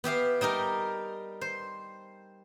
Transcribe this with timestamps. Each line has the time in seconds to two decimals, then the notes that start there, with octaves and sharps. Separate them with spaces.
0.04 B3 G4 E5 F5
0.41 G3 D#4 G4 A#4
1.41 C5